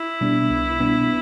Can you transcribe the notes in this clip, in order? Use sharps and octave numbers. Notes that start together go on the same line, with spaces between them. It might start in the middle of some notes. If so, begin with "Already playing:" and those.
Already playing: E4
B2 G3 B3 D4
C2
B2 G3 B3 D4